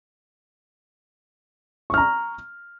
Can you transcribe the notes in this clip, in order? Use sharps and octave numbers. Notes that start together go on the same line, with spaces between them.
A#5 C#6 F6